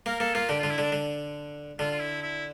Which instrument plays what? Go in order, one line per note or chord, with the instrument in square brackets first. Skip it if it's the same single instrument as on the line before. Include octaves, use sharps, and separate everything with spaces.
[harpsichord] A#3 [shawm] A#4
[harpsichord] A#3 [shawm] A4
[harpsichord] A#3 [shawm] F4
[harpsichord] D3 [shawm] G4
[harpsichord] D3 [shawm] F4
[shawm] E4
[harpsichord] D3 [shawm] D4
[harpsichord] D3
[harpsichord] D3 [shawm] F4
[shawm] F4
E4
E4